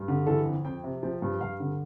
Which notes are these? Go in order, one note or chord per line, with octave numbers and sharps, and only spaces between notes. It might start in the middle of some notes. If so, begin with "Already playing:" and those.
Already playing: G2
D3
E3 A4
F2
F2 G5
C3
F3 G5
G2
G2 F5
D3